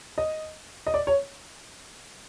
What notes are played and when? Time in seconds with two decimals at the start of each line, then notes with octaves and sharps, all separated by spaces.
0.18 D#5
0.87 D#5
0.94 D5
1.07 C#5